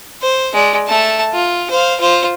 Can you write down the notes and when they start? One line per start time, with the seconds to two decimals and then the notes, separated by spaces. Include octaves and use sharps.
0.22 C5
0.53 G#3 D5
0.88 A3 A5
1.33 F4
1.70 C5 F5
2.00 F4 C5